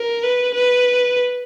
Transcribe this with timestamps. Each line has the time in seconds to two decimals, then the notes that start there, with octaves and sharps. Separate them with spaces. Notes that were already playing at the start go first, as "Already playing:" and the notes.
Already playing: A#4
0.23 B4
0.54 B4